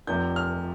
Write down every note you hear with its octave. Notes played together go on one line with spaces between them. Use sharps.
F1 F2 C3 G6
F6